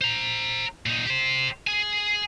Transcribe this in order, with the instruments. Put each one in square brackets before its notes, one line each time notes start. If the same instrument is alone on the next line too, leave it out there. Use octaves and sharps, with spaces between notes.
[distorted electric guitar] C5 A#5
A#2 D#4
G4 C5
G#4 G#5